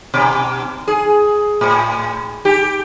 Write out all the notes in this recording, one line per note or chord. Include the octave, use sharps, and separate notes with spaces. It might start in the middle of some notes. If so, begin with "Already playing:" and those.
B2
G#4
A2
G4